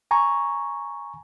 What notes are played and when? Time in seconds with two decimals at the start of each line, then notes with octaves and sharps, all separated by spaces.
0.11 G#5 A#5 C#6